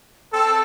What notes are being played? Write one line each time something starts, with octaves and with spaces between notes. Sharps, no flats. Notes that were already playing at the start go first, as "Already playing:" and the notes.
C4 A4